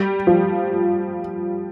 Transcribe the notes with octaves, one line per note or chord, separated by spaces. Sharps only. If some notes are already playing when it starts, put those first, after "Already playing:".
Already playing: G3
F3